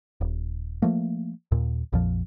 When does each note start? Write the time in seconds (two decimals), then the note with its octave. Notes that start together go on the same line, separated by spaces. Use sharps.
0.21 D#1
0.82 F3 A3 A#3
1.52 D#2 A#2
1.92 A#1 F2 A#2 F3